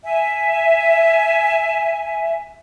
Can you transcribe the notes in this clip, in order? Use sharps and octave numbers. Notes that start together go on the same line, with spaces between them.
E5 G#5